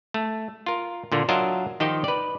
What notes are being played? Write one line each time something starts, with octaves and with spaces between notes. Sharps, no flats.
A3
F4 A#4
A#2 D3 A#3
F#3 D4 F4 A#4 D#5 E5
D#3 F3 D#4 G4 C5 D#5
B4 D5